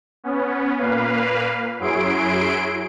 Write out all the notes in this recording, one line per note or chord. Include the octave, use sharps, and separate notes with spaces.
B3 C#4
A#2 A#3 B4 F5
F#2 F#3 E4 G#4 C6 D7